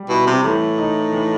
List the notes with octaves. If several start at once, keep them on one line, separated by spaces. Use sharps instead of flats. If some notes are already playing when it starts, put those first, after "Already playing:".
Already playing: G3
B2 E4
C3
A2 E3
D#4
E3